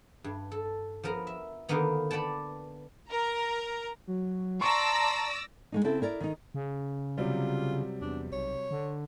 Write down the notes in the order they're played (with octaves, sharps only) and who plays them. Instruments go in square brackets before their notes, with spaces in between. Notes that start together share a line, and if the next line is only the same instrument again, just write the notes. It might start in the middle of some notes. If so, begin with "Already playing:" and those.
[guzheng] G2
A4
F3 B3 A#4 A#5
E5
D3 D#3 A#3 B3 A#5
B4 D5 F#5 G5 A5
[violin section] A#4 A#5
[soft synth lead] F#3
[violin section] D5 E6 A#6 [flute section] A5 A#5 [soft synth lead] C6 [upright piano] C#6
[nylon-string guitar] G#3 A#3 D#4
C#3 C4 E4 A4
E4 A#4 D5
D#3 D#4
[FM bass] C#3
[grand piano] C3 F#3 G3 [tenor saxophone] F4
[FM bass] E2 [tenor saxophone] D4
[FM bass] B1 [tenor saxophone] C#5
[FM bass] D3